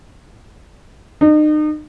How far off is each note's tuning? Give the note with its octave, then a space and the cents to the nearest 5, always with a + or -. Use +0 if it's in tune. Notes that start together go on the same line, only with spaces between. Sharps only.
D#4 -35